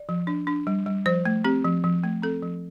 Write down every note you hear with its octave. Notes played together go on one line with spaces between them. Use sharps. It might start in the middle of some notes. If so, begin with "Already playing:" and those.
Already playing: D5
F3
D4
D4
G3
G3
F3 C5
A3
C4 G4
F3
F3
A3
C4 A4
F3